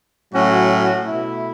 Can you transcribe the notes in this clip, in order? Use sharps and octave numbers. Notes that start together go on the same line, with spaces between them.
A2 F#3 C#4 F#4
B2 A3 E4